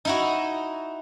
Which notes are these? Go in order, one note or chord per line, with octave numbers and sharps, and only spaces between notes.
D#4 E4 F#4